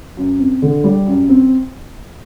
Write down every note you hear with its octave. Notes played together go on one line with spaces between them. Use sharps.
F#2
C4
D3
G3
F#2
C4